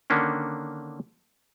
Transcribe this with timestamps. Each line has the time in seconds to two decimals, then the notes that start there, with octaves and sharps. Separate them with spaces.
0.10 D3 D#3 A#3 C#4 D4